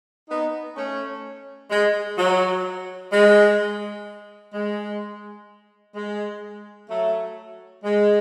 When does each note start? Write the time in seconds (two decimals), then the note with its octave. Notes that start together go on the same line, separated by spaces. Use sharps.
0.29 B3 D#4
0.76 A3 C#4
1.70 G#3
2.18 F#3
3.12 G#3
4.54 G#3
5.95 G#3
6.89 F#3 A3
7.84 G#3